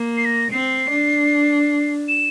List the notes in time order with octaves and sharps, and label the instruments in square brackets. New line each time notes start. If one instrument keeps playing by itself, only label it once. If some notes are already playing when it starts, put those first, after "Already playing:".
Already playing: [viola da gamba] A#3
[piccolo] C7
A#6
[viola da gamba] C4 [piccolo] C7
[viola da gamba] D4
[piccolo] E7